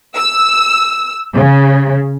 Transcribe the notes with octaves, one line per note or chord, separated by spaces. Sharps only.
E6
C#3